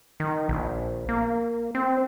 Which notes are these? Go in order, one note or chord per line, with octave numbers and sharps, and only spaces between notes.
D#3
A#1
A#3
C4